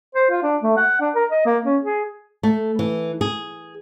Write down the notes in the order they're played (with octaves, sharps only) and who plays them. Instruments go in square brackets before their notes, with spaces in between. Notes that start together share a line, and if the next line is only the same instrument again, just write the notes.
[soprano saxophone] C5
F4
D4
A3
F#5
D4
A#4
D#5
A#3
C#4
G#4
[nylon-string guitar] A3
E3
G#4